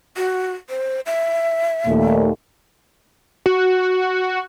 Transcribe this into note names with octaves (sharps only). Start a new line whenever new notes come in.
F#4
C5
E5
D#2 A#2 A3
F#4